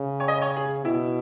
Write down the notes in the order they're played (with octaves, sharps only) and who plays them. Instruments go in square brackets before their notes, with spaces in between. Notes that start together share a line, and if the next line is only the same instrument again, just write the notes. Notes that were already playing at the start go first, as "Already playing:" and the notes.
Already playing: [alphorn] C#3
[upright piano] C#5
D#5
C#5
G#4
[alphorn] B2 [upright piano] E4